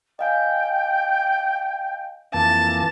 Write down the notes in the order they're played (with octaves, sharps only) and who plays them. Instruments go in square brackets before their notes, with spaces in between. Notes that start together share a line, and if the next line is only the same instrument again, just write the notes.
[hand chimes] D#5 F5 G#5 [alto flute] G5
[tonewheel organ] F2 E3 A#3 [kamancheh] A5